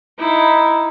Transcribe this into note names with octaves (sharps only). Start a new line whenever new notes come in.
D#4 E4